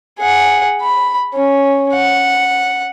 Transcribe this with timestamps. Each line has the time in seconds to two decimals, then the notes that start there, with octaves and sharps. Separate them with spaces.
0.19 G#4 F#5
0.82 B5
1.35 C#4
1.94 F#5